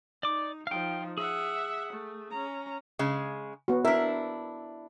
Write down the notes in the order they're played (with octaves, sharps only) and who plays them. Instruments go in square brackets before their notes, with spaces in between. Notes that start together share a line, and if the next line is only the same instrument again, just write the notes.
[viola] D#4 [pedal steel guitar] D5 D6
[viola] F3 D#4 [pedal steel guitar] F5 G5
[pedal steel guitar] G#4 [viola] E5 F#5
[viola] A3
C#4 A#5
[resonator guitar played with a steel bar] C#3 G#3
[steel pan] B3 F#4
[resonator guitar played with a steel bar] D4 E4 [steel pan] A#4 E5